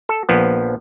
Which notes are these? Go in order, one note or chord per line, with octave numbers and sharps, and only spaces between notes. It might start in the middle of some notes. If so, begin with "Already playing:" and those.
A4
A#1 F3 B3